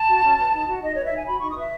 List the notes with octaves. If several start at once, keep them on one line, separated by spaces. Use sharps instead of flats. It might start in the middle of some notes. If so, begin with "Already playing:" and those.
Already playing: A5
F#4
C#4
B4
D#4
F#4
D#4 D#5
B4 C#5
E5
D#4 G#5
F#4 B5
D#4 C#6
D#6
B4 E5